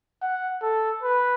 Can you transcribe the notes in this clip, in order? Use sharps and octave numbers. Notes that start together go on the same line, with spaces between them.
F#5
A4
B4